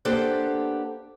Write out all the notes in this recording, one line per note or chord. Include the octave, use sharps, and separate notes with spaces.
A#3 B3 D4 G4 A4 C5